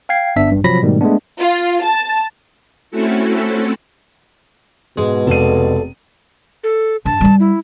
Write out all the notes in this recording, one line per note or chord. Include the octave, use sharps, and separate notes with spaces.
F5 G5 G#6 C7
G1 G2 B3 D4 E5 B6
A1 G2
C3 F3 F#3 B5 A#6 B6
G#2 B2 D#3 G3 A3
G#3 A3 B3 D4
F4
A5
A3 C4 C#4 E4 F#4 A4
G#2 B2 G#3
F1 A4 D5 F5 D#7
A4
G2 A5
G3 D#4
E4